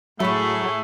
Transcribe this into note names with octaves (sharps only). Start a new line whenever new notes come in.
A2 F#3 A3 G#4 B5 C#6